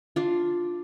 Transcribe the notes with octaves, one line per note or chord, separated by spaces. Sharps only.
D4 F4